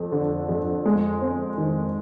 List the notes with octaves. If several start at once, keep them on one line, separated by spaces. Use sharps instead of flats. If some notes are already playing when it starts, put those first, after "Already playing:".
Already playing: F2
D3
F2
G#3
C4
D#3